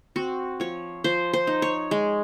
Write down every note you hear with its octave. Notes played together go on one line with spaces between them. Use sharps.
C4 F#4
F3 C#5
F3 C5
C5
D#4
C#5
G#3